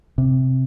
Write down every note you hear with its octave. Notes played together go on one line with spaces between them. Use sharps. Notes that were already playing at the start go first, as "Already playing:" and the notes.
C3